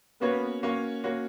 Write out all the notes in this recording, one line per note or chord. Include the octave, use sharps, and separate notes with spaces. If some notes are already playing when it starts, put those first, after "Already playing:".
A#3 B3 C#4 F#4 C#5
A#3 C#4 F#4 C#5
A#3 C#4 F#4 C#5